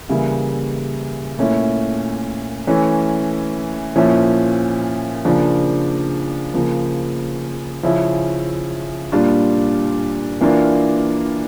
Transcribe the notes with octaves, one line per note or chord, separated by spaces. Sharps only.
C#3 E3 G3 A#3 E4
A#2 A3 C#4 E4
E3 A3 C#4
A#2 F3 C#4 E4
C#3 F3 A#3 D4
C#3 F3 A#3
C#3 F3 C#4 E4
A#2 G3 D4 F4
E3 A#3 D4 F4